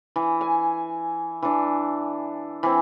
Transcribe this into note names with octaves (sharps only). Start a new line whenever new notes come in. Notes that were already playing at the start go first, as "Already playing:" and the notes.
E3
G#5
E3 D4
E3 C4